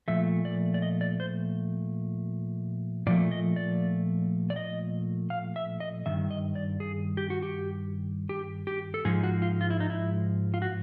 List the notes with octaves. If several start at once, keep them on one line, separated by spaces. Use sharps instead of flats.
A#2 F3 A3 E5
D5
D5
D#5
D5
C5
A#2 F3 A3 D5
D#5
D5
D5
D#5
F5
E5
D#5
G2 D#3 E5
D#5
D5
G#4
G4
F#4
G4
G4
G4
A4
G#2 F3 G#3 G#4
F#4
F4
F4
E4
D#4
E4
F4
F#4